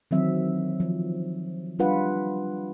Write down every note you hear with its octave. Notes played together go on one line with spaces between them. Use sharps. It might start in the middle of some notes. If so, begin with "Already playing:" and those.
D#3 E3 F#3 C4 E5
F3
G3 D4 F4 B4 F#5